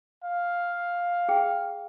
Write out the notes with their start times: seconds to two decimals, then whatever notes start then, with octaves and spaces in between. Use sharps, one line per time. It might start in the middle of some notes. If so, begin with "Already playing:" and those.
0.24 F5
1.29 G#4 G5